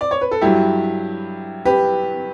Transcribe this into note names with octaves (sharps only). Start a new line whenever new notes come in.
D5
C#5
B4
A4
G2 F#3 E4 G4
G4 B4